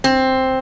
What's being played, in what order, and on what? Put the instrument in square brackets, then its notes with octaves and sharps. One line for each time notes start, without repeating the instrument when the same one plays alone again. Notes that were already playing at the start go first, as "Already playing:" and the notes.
[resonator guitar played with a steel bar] C4